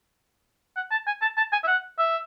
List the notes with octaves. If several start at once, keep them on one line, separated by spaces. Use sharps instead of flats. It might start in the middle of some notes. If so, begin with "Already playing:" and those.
F#5
A5
G#5
A5
A5
G#5
E5
F#5
E5